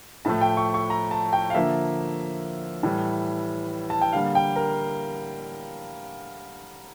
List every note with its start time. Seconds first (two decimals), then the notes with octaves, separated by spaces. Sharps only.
0.25 A2 F3 A3 A5
0.41 G5
0.57 C#6
0.74 C#6
0.90 A#5
1.11 A5
1.33 G5
1.50 F5
1.54 D3 F3 A#3 E5
2.83 A2 E3 G3
3.90 A5
4.01 G5
4.13 D3 G3 A#3 F5
4.35 G5
4.56 A#4